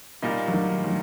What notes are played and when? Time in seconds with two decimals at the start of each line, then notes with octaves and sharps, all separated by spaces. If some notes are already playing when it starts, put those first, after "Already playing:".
0.22 A#2 G3 A#3 D#4
0.48 F#3
0.53 D#3
0.84 F#3